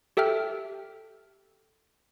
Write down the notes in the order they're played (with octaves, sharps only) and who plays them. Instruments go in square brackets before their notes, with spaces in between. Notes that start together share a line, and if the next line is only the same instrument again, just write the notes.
[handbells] G4 A4 E5 G5 F6